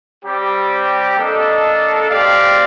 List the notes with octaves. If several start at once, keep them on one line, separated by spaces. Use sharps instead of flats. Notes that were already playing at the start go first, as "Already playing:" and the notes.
G3 C4 G4
A#3 D4 A4 D#5
C4 G4 D5 F5